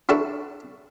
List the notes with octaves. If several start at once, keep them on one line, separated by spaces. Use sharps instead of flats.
D4 E4 F#4 A4 B4